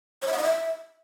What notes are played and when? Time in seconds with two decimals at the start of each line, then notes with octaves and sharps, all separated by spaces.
0.22 C#5
0.27 E5
0.33 F#5
0.38 D#5
0.43 E5